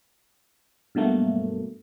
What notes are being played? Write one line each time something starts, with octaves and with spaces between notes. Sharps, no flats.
G2 B2 F#3 A3 A#3